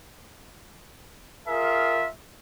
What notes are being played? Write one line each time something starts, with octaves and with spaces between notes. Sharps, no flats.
F4 G#4 A#4 E5